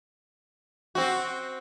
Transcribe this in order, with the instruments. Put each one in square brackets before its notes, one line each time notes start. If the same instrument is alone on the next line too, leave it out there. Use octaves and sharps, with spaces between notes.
[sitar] C4 F#4